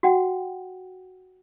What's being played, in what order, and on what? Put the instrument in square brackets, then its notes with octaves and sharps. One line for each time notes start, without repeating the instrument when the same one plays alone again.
[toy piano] F#4 F#5 G5